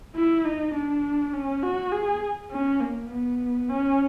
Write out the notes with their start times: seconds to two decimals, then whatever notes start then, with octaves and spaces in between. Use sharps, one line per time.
0.15 E4
0.44 D#4
0.74 D4
1.33 C#4
1.63 F#4
1.92 G#4
2.51 C#4
2.80 A#3
3.10 B3
3.69 C#4